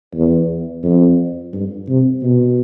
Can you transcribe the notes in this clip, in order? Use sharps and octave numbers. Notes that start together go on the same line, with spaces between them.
E2
F2
G2
C3
B2